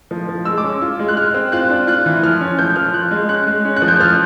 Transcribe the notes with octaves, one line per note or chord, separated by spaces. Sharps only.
F3
F3
G#3 E6
D6
C#4
F4
G#3
F#6
G#3 F6
C4
F4 F#6
D4
F4 F#6
E3
F3 F6
C#4
F3 G6
F3 F6
F4 F#6
G#3
C#4 F#6
G#3
C#4
F#6
F3
G6
F3 F6